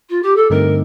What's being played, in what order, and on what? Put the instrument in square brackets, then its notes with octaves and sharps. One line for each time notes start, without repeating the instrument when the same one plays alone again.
[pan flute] F4
G4
A4
[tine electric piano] G2 D3 A3 C4 D#4 [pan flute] A#4